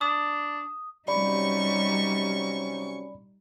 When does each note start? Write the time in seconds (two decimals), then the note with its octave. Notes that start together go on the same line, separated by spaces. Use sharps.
0.01 D4 D#6
1.08 C3 F#3 G3 C#4 D#4 D5 B5 C#6